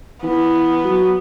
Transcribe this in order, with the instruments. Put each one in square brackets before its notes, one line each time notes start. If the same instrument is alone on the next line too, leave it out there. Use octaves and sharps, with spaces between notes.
[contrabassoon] E3 [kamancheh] B3
[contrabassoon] F#3